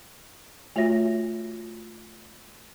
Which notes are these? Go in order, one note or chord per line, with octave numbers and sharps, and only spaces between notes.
A3 F4 F#4 C#5 E5 A#6